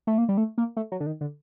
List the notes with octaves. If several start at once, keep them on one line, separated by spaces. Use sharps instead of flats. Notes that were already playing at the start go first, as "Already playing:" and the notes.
A3
A#3
G3
A3
A#3
A3
F#3
D3
D#3
D3